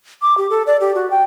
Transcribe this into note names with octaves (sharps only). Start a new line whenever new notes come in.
D6
G4
A4
D5
G4
F#4
G5